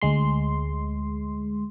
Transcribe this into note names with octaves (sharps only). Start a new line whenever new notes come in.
D2 G#3 C6